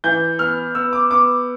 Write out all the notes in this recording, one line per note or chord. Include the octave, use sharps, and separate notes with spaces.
E3 G6
B3 F6
B3 E6
D6
B3 D6